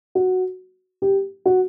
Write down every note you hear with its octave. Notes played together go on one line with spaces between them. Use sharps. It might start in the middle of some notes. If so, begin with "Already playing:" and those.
F#4
G4
F#4